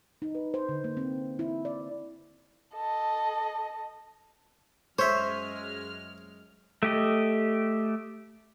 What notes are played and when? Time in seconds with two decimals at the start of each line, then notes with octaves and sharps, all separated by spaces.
0.22 D#4
0.35 B4
0.54 C5
0.69 D3
0.84 A#3
0.97 C4
1.39 E4
1.65 D5
2.74 A4 D#5
4.99 F#2 G#3 C5 C#5 E5 F6
6.83 A3 G4 D#5